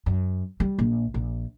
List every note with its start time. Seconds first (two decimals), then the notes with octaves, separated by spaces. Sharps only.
0.06 F#2
0.60 G3
0.79 A#1
1.14 A#1